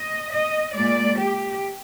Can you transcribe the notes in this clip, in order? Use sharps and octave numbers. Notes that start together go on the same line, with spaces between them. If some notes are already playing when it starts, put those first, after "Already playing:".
Already playing: D#5
D#5
A#2 G#3 D5
G4